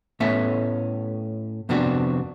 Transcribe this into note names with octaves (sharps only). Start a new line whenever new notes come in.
A2 A3 B3 C#4 E5
F2 C3 B3 C4 D4 F#4